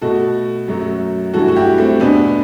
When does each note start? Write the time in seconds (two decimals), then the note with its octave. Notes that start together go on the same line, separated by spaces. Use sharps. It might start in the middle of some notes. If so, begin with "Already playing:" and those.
0.02 B2 A3 F#4 A4
0.68 F#2 F#3 A3
1.34 G2 E3 A3 F#4 A4
1.48 F#4
1.56 E4 G4
1.78 A3 C4
2.00 E2 B2 A3 B3 D4